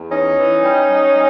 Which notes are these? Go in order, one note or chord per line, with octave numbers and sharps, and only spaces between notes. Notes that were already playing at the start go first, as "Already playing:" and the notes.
Already playing: E2
E3 C#4 D#4
E3
G3
G3
G3